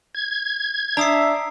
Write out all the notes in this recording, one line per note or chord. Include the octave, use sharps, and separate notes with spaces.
G#6
D4 E5 A#5 D#6 C7